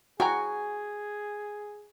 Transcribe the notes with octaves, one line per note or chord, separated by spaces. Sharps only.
E4 F#4 G#4 G5 G#5 A#5